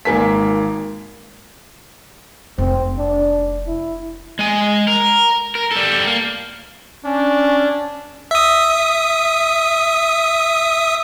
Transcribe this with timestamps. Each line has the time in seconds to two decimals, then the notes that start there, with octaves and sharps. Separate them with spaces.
0.05 G#1 D#3 A#3 G#5 B6
2.58 F1 C4
2.98 D4
3.67 E4
4.39 G#3 G#5
4.87 A#4
5.55 A#4
5.71 G3 A4
6.07 A#3
7.05 C#4 D4
8.31 E5 D#6